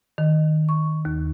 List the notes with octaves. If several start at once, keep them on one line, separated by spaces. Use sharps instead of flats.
D#3
C#6
D#2